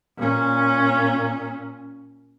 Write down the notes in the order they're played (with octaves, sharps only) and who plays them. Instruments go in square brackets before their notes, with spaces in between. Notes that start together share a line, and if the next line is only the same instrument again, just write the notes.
[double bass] A#2 C#4